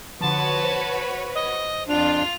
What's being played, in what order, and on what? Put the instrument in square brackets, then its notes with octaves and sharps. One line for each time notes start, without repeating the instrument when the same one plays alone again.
[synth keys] D3 F3 [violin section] F#4 B4 C#5 [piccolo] A5
[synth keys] C5
[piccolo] D#5
[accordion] F2 D4 [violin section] F4 [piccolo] F7